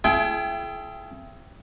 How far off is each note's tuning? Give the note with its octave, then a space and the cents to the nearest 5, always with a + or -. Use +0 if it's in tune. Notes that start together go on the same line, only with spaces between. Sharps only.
E4 +35 G#4 +40 G5 +0